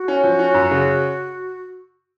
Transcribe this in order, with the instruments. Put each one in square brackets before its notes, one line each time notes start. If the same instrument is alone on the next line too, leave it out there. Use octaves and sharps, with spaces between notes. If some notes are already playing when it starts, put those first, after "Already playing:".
Already playing: [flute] F#4
[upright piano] C#4
F3
C#4
F#2
C#3